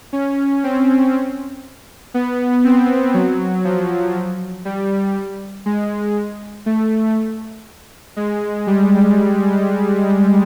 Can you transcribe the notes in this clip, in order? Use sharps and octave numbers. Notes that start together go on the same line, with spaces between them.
C#4
C4
B3
C4
F#3
F3
G3
G#3
A3
G#3
G3